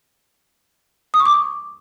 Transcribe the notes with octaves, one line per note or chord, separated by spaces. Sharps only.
D#6
C#6
D6